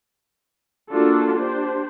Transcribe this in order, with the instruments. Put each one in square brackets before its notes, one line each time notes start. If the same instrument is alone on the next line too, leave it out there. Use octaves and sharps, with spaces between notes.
[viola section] A#3 D4 F4 F#4 A4
D4 G4 C5